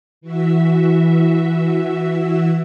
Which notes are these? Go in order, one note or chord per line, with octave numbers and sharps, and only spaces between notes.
E3 F#4 E5